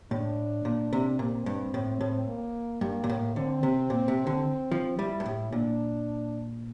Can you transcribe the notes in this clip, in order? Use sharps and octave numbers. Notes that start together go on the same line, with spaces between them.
A2 D4
A#2
C3
A#2 C4
G2
A2
A2
A#3
G2 A#3
A#2
A2
D3 C4
C3
A#2
C3
D3
F3
G3 E4
G2
A2
A#2 D4